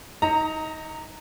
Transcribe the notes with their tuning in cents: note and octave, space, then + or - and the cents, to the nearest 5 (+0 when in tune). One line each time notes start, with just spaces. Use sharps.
D#4 +20 A#5 -15